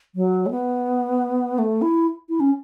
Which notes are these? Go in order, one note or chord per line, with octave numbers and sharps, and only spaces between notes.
F#3
A3
B3
A3
E4
E4
C#4